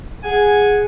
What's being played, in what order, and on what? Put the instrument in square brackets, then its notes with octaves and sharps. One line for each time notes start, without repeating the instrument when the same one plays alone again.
[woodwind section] G#4 F#5 G#5